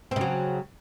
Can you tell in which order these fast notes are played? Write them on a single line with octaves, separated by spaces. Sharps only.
C4 C#3 F#3